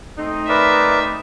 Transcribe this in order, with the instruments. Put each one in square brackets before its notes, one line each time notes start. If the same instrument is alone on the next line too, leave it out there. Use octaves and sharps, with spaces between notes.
[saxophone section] A3 C4 D#4
[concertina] A#4 B4 D5 [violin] E5